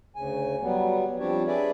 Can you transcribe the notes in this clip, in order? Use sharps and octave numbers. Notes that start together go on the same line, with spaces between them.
D2 C#3 G#5
F#3 G3 B3
F3 G3 C4 D4 G4 C#5
D4 G#4 B4 D5 E5